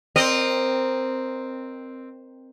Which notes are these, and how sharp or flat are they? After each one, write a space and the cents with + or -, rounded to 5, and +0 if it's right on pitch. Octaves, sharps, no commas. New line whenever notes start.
C4 +0 A#4 +0 D#5 -30